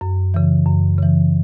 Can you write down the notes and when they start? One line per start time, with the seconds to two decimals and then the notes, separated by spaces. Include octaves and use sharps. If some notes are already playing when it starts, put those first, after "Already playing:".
0.01 F#2
0.34 C#3 E3
0.66 F#2
0.99 C#3 E3